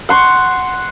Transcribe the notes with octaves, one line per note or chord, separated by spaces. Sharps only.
F#5 C6 C#6